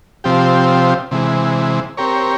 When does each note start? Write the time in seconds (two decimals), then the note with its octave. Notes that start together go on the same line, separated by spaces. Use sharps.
0.24 C3 F3 C4 G4
1.11 C3 E3 G#3
1.97 C4 G4 A#4 C#5